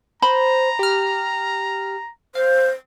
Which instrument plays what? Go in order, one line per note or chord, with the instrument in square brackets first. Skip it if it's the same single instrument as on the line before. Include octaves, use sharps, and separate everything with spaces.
[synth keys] C5 [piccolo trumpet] A#5 [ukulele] B5
[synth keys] G4 F6
[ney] C5 [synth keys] F5